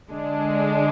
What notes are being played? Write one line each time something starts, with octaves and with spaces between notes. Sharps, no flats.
D3 G#3 D4